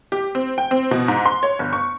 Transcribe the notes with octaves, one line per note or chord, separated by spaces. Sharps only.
G4
C4
G5
C4
B2
G#2
C6
C#5
G1
C#6